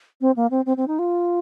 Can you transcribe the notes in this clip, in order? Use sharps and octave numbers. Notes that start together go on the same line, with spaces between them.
C4
A#3
C4
C4
C4
D#4
F4